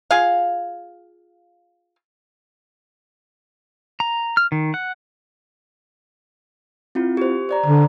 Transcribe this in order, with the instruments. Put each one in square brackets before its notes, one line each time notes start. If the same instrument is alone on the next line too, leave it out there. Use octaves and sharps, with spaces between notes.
[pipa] F4 G#4 F5
[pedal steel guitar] A#5
F6
D#3
F#5
[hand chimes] C4 E4 F4
G4 C5
C5 D5 A#5
[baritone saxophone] D3